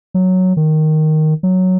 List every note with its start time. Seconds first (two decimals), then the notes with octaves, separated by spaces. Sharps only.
0.14 F#3
0.57 D#3
1.43 F#3